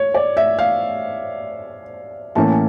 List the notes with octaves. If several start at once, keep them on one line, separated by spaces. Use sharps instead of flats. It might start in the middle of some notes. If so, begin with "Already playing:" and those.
Already playing: C#5
D5
E5
F5
A2 E3 A#3 C#4 A5